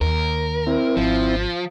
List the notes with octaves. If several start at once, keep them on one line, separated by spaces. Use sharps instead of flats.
D#2 A#4
C4 E4
G#1 F3